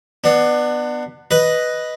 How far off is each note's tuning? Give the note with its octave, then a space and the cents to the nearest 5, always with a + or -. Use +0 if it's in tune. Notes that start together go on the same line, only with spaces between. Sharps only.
B3 +0 D4 +30
B4 +0 D#5 +0